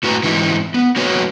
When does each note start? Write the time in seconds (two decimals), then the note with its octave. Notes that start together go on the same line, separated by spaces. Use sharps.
0.03 A2 F#4 B4 A#5
0.23 G#2 E3 C4 D#4 E4
0.74 B3
0.96 F#3 A#3 D#4 F#4 B4 C#5